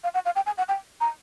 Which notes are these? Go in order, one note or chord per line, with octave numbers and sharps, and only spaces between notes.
F5
F#5
F5
G5
G#5
F#5
G5
A#5